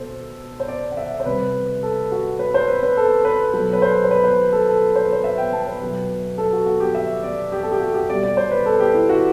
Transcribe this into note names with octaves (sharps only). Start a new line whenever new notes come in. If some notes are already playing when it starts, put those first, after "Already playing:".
Already playing: B2 A4 C5
C5
D5
F#5
E5
C5
C3 G3 B4
A4
F#4
B4
C5
B4
B4
A4
B4
B2 F#3 A4
B4
C5
C5
B4
C5
A4
A4
C5
B4
C5
E5
G5
A5
B4
B2 F#3
A4
F#4
F#4
G4
E5
D5
G4
A4
G4
F#4
G4
B2 G3 D5
D5
C5
B4
A4
G4
E4
F#4